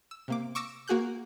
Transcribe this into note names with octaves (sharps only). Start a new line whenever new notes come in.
E6
C3 A#3 D6
C#6 D6 E6 A#6 C#7
A#3 F#4 G#4 F#6 G6